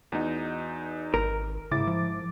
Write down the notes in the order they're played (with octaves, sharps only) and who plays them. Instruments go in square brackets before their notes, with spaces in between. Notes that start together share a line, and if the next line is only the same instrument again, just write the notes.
[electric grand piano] E2 D#4 [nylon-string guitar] B3 F#4
[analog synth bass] G#1 [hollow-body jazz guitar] A#4
[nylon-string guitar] G#2 E4 [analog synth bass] C#3 [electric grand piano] D6 A6
[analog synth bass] F3